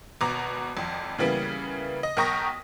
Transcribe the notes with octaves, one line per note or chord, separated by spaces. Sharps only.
G#1 B2 A#5 D6
G#1 F2
C#3 E3 G3 A#3 B3
D#5
B1 A#4 G5 C#6 D#6 A#6